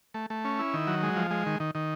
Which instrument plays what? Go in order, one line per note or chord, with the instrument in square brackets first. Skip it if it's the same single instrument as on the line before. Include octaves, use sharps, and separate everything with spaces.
[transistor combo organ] A3
A3
C#4
E4
D#3
F#3
G#3
F3
G#3
D#3
D#3
D#3